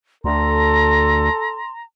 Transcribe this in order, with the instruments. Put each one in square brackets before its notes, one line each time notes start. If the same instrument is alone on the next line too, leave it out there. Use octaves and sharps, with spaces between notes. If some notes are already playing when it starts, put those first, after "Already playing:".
[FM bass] D2 [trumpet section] A4 [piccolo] A#5 [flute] C6